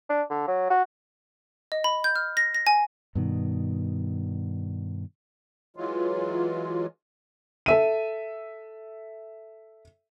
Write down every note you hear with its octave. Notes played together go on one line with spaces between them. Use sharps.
D4
D3
F#3
F#4
D#5
B5
G6
F6
A#6
A#6
G#5
G2 B2 D#3
E3 F#3 G#3 F4
A4 E5 D#7